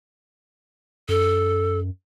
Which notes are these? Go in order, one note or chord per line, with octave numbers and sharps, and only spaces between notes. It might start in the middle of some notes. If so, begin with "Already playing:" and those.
F#2 A4